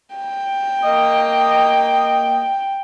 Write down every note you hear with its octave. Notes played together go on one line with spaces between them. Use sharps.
G5
A#3 D#5